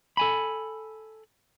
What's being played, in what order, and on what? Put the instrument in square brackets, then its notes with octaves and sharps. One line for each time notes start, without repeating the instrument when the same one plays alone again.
[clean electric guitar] A4 G#5 B5